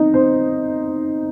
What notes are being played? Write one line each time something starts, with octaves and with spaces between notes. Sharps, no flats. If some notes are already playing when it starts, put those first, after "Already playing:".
Already playing: C4 D#4 D#5
C4 C5